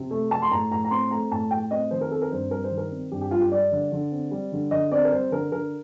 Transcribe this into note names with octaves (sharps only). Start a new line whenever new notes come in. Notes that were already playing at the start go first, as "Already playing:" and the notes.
Already playing: C3
A3
A3 A5
C6
A2 A#5
A2 A#5
A#5
C4 C6
A3 A#5
A2 A5
A2 G5
C4 D#5
D#3 C5
A#4
C4 A4
A#4
G2 C5
G3 A#4
C5
D#3
A#4
C4
G2 G4
G4
G3 F4
G4
G3 D5
D3
D3
C4
G3
D3
D3 D#5
C4 D5
A#4
G3 C5
D3 A#4
D3 A#4